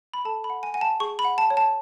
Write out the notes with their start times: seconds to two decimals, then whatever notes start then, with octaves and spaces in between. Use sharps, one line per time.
0.14 B5
0.25 A4 A5
0.44 B5
0.50 F#5
0.63 G#5
0.74 F#5 G#5
0.81 A5
1.00 G#4 C#6
1.19 B5
1.25 F#5
1.38 A5
1.50 C#5
1.57 A5